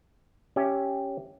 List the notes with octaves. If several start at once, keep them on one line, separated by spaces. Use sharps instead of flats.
C#4 G4 E5